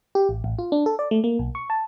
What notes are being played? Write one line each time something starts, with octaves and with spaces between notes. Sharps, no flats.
G4
A1
A1
F4
D4
A4
D5
A3
A#3
B1
C#6
A5